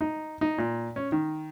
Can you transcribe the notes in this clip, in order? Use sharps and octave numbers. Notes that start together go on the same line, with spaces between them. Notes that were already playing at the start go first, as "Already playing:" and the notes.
D#4
D#4
A#2
C#4
D#3